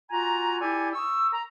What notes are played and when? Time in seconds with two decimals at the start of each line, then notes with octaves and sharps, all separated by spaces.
0.11 F4 F#4 G#5 A#5
0.61 E4 G4 A4 D5 G#5
0.94 C#6 D#6 E6
1.33 A#5